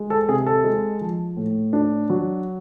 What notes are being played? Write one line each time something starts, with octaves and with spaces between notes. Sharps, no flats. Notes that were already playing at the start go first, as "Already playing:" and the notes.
Already playing: G#3
A4
C3 G#4
A4
G#3
F3
A2
D4
F#3